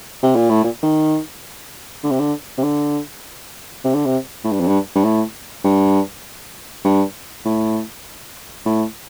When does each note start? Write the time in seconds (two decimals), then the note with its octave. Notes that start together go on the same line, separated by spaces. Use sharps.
0.23 C3
0.36 A#2
0.50 A2
0.64 A#2
0.83 D#3
2.04 D3
2.11 C3
2.20 D3
2.58 C3
2.64 D3
3.84 C3
3.95 D3
4.06 C3
4.44 A2
4.52 G2
4.60 F2
4.67 G2
4.95 G2
5.04 A2
5.64 G2
6.85 G2
7.45 A2
8.66 A2